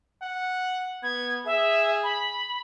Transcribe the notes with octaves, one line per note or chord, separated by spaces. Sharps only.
F#5
B3 G#6
G#4 E5
B5